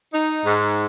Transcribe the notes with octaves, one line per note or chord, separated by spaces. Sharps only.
D#4
G#2